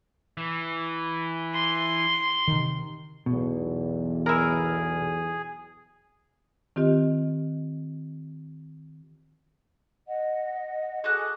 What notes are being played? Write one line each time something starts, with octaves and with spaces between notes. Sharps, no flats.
E3
C6
C3 D#3
B1 E2 B2
E4 G#4 A#4
D#3 C4 F4 G4 D#5
D#5 F#5
F#4 G#4 A4 D#5 D6 F#6